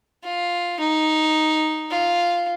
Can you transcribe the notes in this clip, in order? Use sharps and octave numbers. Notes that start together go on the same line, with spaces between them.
F4
D#4
F4